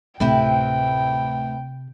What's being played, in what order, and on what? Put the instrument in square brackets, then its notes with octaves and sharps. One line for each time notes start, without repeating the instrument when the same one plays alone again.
[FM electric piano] D2 A2 A3 [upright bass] C3 [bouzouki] C4 E4 B4 [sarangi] G5